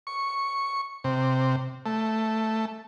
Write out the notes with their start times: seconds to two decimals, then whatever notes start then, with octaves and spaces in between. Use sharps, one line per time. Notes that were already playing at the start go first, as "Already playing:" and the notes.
0.07 C#6
1.04 C3
1.86 A3